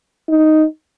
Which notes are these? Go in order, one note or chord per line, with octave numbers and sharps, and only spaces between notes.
D#4